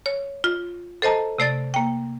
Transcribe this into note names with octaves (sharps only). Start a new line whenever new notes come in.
C#5
F4
A4 C5 D#5 A5 A#5
C3 A3 D5 A6
A#3 G5